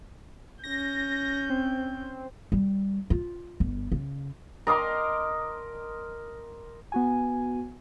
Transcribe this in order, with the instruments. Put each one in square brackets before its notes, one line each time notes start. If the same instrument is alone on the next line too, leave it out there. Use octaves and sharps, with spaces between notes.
[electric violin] C#4 G6 [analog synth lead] A#6
[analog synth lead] C4
[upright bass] G3
F4
G1
C#3
[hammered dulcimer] A#4 D#5 C6 D6
[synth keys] B3 F#4 G#5